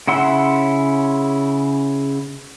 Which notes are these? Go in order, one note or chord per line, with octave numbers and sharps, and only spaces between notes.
C#3 E4 F#5 C6 E6